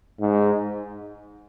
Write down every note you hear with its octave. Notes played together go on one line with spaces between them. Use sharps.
G#2